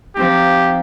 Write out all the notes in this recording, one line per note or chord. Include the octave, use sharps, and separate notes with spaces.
F3 C4 D#4 G4